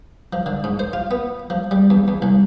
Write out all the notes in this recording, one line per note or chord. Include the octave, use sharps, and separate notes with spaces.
F3
D3
G#2
C5
F4
B3
F3
G3
E2
E2
C2